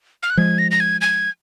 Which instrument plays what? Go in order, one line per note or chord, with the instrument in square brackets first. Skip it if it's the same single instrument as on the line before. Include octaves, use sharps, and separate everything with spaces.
[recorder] F6
F#6
[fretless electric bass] F3 G#3 [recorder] G#6
[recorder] A#6
A#6
G#6
G#6